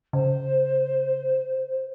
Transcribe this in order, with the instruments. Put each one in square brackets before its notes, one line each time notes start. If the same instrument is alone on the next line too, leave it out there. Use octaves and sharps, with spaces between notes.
[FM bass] C#3 [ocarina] C5